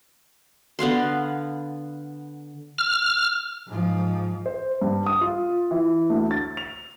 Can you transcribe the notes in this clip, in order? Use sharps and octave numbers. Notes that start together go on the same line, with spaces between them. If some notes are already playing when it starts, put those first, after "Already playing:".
D3 B3 F5 C6
F6
G#2 F3
C5
G2
D#6
F4
E3
D2
A6
F7